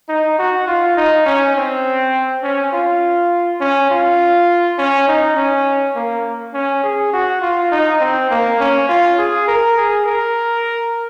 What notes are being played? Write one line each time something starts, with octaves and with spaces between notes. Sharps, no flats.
D#4
F#4
F4
D#4
C#4
C4
C#4
F4
C#4
F4
C#4
D#4
C#4
A#3
C#4
G#4
F#4
F4
D#4
C4
A#3
C#4
F4
G#4
A#4
G#4
A#4